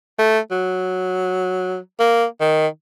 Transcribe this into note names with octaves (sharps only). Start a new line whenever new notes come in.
A3
F#3
A#3
D#3